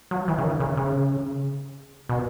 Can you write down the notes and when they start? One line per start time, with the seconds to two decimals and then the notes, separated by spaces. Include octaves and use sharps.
0.11 F#3
0.28 E3
0.38 C#3
0.44 D#3
0.60 C#3
0.77 C#3
2.09 B2